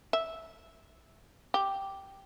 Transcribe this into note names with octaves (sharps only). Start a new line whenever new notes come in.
E5
G4